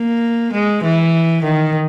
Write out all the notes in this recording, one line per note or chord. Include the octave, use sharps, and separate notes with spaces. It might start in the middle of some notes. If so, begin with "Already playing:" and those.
Already playing: A#3
G#3
E3
D#3